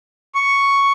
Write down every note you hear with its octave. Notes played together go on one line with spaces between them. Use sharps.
C#6